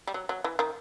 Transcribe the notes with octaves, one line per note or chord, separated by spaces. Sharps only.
G3
F#3
F#3
E3
D#3